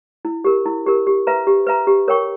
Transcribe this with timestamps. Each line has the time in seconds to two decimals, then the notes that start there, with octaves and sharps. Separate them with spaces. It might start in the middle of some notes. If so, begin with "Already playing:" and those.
0.25 E4
0.44 G4 A#4
0.66 E4
0.86 G4 A#4
1.07 G4
1.27 B4 E5 A#5
1.47 G4
1.67 B4 E5 A#5
1.87 G4
2.08 A#4 C#5 G5 C#6